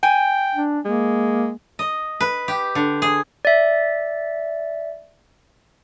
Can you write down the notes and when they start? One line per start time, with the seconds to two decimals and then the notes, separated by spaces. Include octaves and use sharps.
0.03 G5 G#5
0.55 D4
0.85 G#3 A#3
1.79 D#5
2.21 B4
2.48 G4
2.75 D3
3.02 G#4
3.45 D5 E5